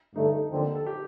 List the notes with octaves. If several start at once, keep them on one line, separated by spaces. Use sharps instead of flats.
G2 D3 A3 D#4
D#2 D3 F3 C4
A4
G4